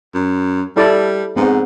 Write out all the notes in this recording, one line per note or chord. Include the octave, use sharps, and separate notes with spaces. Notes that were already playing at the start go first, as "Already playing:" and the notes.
F#2
G3 E4 A4 D5
G#2 B3 C4